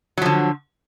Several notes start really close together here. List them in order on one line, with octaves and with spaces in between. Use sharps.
F#3 F3 D3